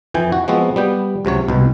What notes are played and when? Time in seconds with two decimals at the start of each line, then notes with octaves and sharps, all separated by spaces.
0.14 F2 E3 G5 G#5
0.32 F#4
0.48 F3 G#3 B3 C4 F#4
0.76 G3 B3 G5
1.25 C#2 C3 F#3 C#5
1.48 C2 B2